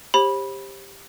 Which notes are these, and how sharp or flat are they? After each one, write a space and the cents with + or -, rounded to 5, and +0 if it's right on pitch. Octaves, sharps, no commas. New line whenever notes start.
G4 +15 C5 +40 B5 -15